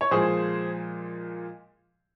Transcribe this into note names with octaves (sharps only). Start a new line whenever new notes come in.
C#5
A#2 F3 G#3 G#4 C5